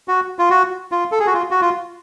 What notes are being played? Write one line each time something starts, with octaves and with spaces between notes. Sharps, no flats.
F#4
F4
F#4
F4
A4
G#4
F#4
F4
F#4
F4